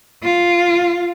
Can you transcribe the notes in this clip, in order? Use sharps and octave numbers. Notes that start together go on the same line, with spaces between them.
F4